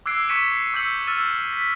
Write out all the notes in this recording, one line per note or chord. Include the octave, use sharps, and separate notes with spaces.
D6 E6 F#6 G#6 C7 D7
C#6 G#6 B6 C#7 D#7 E7
D6 E6 G6 B6 C#7 F#7
E6 F6 A6 D#7
B6